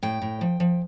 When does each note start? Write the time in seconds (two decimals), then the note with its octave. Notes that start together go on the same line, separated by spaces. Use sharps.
0.03 A2 G5
0.22 A2
0.41 F3
0.60 F3